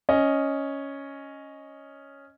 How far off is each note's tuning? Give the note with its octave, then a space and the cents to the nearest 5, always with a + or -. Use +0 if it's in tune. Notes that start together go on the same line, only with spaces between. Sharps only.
C#4 +0 D#5 +0